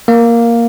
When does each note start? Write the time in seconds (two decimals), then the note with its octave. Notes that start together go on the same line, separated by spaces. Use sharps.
0.08 A#3